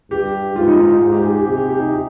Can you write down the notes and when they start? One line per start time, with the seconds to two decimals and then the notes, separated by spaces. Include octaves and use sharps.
0.11 G2 G4
0.56 G#2 F4
0.68 D#4
0.78 D#4
1.01 G#2 G#4
1.12 G4
1.24 G#4
1.35 G4
1.47 C3 G4
1.57 G4
1.69 G4
1.79 D#4